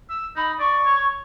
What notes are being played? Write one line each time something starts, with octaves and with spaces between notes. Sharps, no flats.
E6
D#4 B5
D5 C#6
C#5